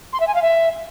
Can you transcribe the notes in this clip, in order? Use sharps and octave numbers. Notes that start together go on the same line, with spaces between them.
C6
E5
G#5
F5
E5